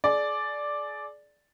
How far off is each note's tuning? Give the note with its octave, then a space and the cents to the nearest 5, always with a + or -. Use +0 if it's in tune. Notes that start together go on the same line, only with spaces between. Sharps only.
G#4 +35 D5 +0